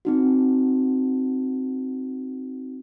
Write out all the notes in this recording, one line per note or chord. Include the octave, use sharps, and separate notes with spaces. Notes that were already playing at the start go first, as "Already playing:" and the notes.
C4 D#4 F#4